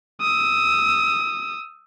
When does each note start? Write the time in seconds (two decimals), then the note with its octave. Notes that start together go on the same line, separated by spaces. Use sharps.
0.21 D#6 E6